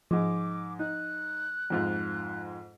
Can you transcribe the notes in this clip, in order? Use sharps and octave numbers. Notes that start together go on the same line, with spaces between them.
G#2 F3 G#3 D6
D#4 F#6
F2 G#2 F4